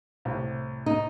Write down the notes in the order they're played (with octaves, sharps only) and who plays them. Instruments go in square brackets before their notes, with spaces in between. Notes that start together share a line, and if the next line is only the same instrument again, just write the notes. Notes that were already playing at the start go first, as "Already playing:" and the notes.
[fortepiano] C2 A2
[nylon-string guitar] D#4